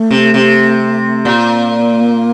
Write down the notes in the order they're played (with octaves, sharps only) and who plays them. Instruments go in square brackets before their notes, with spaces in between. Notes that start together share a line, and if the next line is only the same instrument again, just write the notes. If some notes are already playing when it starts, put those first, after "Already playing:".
Already playing: [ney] A3
[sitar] C3
C3
[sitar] A#2 [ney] A#3